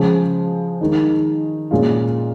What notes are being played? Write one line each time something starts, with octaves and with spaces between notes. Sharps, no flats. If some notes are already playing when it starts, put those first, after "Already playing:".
Already playing: C#3 F3 G#3
D#3 G#3 D#4
A#2 G#3 C#4 F4